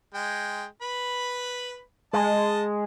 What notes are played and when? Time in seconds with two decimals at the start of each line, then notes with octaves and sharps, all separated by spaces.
0.14 G#3 G5
0.82 B4 B5
2.13 G#3 D#5 A5